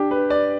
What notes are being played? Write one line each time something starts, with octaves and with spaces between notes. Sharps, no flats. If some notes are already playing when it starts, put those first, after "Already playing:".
Already playing: D4 G4
B4
D5